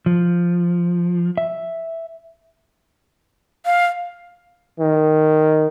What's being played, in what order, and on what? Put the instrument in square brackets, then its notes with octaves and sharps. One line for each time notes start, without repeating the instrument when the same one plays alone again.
[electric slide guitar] F3
E5
[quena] F5
[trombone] D#3